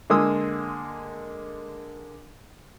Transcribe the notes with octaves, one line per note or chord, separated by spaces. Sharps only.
D3 G#3 A#3 C6 D#6 E6